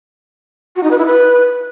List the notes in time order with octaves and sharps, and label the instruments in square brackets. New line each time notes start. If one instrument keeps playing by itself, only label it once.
[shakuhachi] F#4
D#4
B4
E4
B4